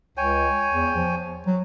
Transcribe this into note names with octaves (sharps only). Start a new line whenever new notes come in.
C#2 C#5 G5 G#5
E2
F3
F#3